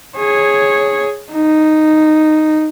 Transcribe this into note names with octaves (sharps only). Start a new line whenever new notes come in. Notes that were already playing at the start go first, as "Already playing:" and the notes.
G#4 C#5
D#4